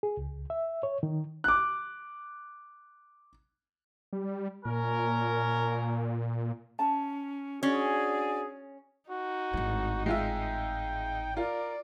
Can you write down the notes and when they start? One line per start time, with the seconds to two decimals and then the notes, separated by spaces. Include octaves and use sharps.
0.03 G#4
0.17 C#2
0.50 E5
0.83 C#5
1.03 D#3
1.44 D6 F#6
4.13 G3
4.65 A#2 C#4 A#4
6.79 C#4 A5
7.63 C#4 D4 F#4 G#4 D5
9.10 D#4 F#4
9.53 G#1 A2
10.06 G#3 F4 E5 G5
11.37 F4 A#4 D5